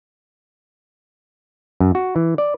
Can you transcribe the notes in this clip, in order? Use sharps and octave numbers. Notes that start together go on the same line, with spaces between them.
F#2
F#4
E3
D5